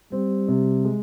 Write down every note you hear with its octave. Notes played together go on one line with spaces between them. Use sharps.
G3 C4
C3
G#3